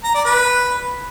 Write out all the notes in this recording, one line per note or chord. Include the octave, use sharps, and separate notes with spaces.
A#5
D5
B4